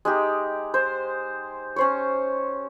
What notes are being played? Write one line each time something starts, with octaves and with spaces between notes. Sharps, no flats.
G#3 D#4 G4
C5
C#4 C5 C#5